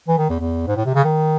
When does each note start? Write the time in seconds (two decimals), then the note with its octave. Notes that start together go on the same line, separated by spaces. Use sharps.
0.08 E3
0.18 D#3
0.30 E2
0.40 E2
0.68 G#2
0.77 A2
0.86 C3
0.95 C#3
1.05 D#3